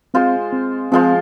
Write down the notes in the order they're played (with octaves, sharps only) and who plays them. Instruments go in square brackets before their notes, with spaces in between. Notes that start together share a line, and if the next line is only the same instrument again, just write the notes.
[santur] G#3 F4 C5 [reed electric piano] C4
[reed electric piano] C4
[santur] F3 G#3 F4 C5 [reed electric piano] C4